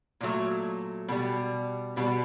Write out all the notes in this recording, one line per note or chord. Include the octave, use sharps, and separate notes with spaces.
A#2 F#3 A3
B2 G3
B2 G3 B4